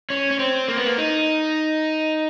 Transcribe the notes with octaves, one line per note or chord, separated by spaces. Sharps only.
C#4
C#4
C4
A#3
B3
A#3
D#4